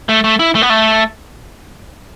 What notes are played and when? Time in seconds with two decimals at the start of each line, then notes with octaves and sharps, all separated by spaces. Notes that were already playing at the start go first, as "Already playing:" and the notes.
0.09 A3
0.24 A3
0.39 E4
0.55 A3
0.62 B3
0.70 A3